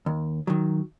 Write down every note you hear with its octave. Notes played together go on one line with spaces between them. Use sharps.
D#2
D#3 F#3